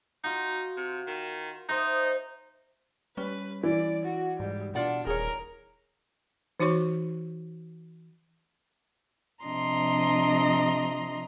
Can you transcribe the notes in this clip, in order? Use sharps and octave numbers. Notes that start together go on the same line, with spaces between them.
D#4 F4 F#4
C3
D#3
D#4 C5 D#5 E5
G3 C#4 B4
E3 D5
F#4
G#2 G3
B2 D4 F4 D5 F#5
D#1 G#4 A#4 C#5
E3 D#4 F#4 C#5 C#6
C3 F3 D4 D#5 A#5 C6